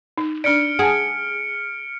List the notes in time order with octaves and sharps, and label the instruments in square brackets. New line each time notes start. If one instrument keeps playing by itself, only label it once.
[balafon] D#4
[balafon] D4 D5 [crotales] F6 C#7 D7
[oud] G#4 [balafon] F#5 A5